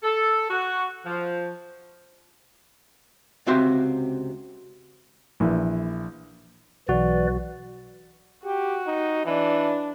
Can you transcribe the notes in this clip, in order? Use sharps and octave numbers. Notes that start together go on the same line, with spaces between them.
A4
F#4
F3
C#2 C3 C4 F#4 E5 C6
A#1 E3
B1 E3 F#4 B4 D5
F#4 G4
D#4
E3 D4